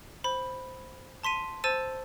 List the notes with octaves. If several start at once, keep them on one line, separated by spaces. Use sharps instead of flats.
C5 B5
A5 C6 B6 D#7
C5 A5 E6 A6 D#7